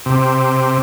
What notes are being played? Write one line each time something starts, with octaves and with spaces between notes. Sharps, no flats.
C3